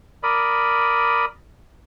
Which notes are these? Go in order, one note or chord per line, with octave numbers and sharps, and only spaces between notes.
A#4 D5 B5 D#6